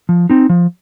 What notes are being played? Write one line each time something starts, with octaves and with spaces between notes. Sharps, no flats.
F3
C4 D#4
F3